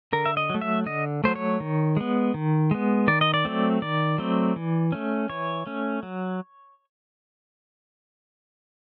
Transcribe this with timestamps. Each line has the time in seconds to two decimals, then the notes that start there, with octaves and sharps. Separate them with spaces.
0.13 D3 A#4
0.26 E5
0.37 D#5
0.50 F#3 A3
0.61 E5
0.86 D3 D#5
1.24 F#3 A3 C5
1.36 C#5
1.60 D#3
1.97 G#3 B3
2.34 D#3
2.71 G#3 B3
3.08 D#3 D5
3.21 D#5
3.34 D5
3.45 F#3 A3 C4
3.82 D#3 D5
4.18 F#3 A3 C4
4.56 E3
4.92 A3 C#4
5.29 E3 C#5
5.66 A3 C#4
6.03 F#3